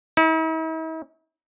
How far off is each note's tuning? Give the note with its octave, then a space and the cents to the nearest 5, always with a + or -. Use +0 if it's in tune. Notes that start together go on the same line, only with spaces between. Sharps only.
E4 -45